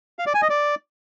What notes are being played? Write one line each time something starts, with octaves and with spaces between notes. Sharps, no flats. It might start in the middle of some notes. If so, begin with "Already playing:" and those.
F5
D5
G#5
D#5
D5